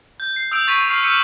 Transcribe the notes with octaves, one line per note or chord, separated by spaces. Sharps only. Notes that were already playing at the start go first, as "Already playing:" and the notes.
G6
C7
D#6 E6 G6 D7 F7
C#6 A6 B6 D#7 F7
C#6 F6 C7 F7
D6 E6 F6 G6 C#7 D#7